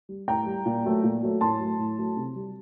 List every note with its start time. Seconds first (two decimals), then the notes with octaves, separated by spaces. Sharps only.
0.09 G3
0.27 A2 G5 A#5
0.46 G3
0.66 A#2
0.85 F#3 A3
1.03 A#2
1.23 F#3 A3
1.41 A2 A5 C6
1.60 F#3 A3
1.79 A2
1.98 F#3 A3
2.17 C3
2.36 G3